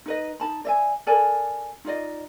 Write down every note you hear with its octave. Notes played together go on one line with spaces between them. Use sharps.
D#4 B4 D#5
D#4 A5 B5
D5 E5 G#5
A4 A#4 D5 G#5
D#4 F4 D5 D#5